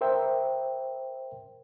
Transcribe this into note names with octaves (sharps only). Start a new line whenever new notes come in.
A#4 C5 E5 G5